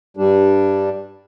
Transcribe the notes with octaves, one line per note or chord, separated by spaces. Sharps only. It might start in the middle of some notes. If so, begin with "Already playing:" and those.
G2 G3 D4